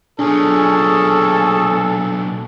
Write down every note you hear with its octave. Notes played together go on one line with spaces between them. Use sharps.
B1 A#2 C#4 D4 G#4 A4